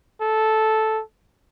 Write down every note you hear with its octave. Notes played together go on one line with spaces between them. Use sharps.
A4